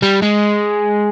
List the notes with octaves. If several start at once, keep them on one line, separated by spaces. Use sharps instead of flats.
G3
G#3